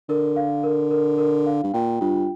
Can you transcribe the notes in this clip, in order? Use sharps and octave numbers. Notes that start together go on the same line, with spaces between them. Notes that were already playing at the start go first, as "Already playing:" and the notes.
D3 A#4
F5
A#4
A#4
A#4
F5
G2
A#2 G5
G2 F4